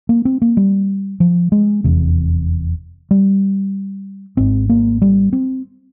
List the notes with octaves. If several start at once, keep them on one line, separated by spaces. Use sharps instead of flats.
A#3
C4
A#3
G3
F3
G#3
F1 E2 C3
G3
G#1 G#2 C4
A#3
G3
C4